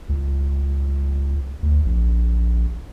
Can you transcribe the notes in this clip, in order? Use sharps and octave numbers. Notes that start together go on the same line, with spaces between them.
C#2
D2
A#1